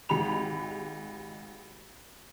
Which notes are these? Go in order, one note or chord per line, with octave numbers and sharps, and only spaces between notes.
G#1 G#3 G4 B5 F7